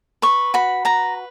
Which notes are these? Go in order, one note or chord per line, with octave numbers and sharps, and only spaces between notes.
B4 C#6
F#4 B5
B4 A#5